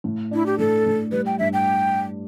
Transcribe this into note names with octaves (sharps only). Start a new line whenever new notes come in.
A2
D4 E4
G4
A2 A4
A2
G3 B4
G5
G2 E5
G5